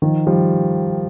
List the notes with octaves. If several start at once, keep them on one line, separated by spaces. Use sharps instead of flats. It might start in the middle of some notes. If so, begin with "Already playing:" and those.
D#3 F3
F3 G3